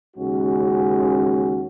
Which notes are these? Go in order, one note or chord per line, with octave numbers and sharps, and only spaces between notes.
D#2 C#3 G#3 C#4 F#4